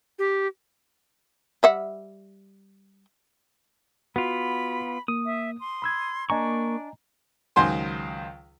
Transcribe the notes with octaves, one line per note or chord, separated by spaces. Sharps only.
G4
G3 E5 F#5
B3 F4 F#4 B5
A#3 D#6
E5
C6
B5 E6 G#6
A#3 D4 D#5 G#5 A#5 C#6
C#2 D#3 F#3 C5 G#5 C6